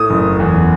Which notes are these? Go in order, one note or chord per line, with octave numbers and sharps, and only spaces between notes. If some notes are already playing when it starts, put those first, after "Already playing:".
Already playing: A2 D#6
F#1
E2